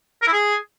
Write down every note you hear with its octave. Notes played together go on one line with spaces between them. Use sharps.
A#4
E4
G#4